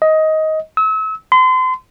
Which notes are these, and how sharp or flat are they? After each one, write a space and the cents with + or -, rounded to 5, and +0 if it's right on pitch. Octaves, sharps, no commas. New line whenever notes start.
D#5 +15
E6 -35
C6 -35